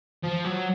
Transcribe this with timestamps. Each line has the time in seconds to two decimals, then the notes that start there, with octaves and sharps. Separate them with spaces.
0.23 F3
0.44 F#3